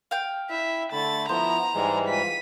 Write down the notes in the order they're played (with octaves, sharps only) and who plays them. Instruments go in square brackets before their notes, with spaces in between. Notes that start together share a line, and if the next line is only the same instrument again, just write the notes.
[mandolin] F5 G5
[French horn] E4 [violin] E5
[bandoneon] D3 B5 [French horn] A3 [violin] A6
[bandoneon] F3 B3 [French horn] E4 [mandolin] C5 [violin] A#5
[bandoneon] G#2 E3 G3 [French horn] G#3
[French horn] F4 [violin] B6 D#7